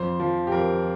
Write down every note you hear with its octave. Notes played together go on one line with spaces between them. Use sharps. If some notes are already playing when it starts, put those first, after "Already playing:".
Already playing: F2 C5
F3
G4
F2 A#4